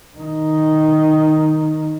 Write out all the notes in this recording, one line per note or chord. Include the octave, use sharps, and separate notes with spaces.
D#3 D#4